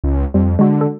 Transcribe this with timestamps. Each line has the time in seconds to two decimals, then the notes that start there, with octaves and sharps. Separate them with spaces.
0.04 C#2
0.34 F2 G3
0.59 D3 G#3 F#4
0.81 A4